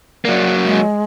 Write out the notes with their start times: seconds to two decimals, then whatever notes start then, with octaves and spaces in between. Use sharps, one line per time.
0.25 F#3 A#3 D5
0.64 G#3